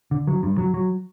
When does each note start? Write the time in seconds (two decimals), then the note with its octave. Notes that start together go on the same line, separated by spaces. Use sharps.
0.11 D3
0.27 F#3
0.43 G2
0.58 F#3
0.74 F#3